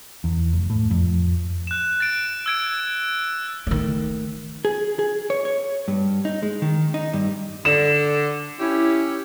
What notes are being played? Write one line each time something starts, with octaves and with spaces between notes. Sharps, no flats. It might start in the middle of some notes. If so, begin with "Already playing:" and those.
E2
F1
A2
F2
F#6 E7
A6 D7
E6 G#6 D7
D#3 A3
G#4
G#4
C#5
C#5
G2
D#4
G#3
D#3
D#4
G2
D3 E7
C#4 E4 G4